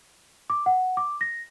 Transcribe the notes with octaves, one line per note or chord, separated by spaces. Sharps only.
D6
F#5
D6
A#6